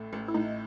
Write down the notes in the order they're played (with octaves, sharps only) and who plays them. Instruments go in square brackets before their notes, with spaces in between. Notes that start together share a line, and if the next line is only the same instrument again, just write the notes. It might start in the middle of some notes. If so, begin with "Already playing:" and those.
Already playing: [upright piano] A1 A2 A3
A1
[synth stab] E4
[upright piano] A2 [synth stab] D#4